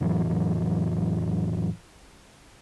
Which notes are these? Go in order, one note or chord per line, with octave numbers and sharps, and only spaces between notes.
F2 A2 E3 F#3